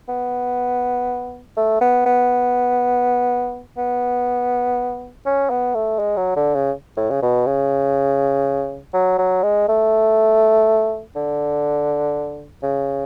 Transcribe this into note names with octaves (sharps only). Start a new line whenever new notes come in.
B3
A3
B3
B3
B3
C#4
B3
A3
G#3
F#3
D3
C#3
A2
C#3
B2
C#3
F#3
F#3
G#3
A3
D3
C#3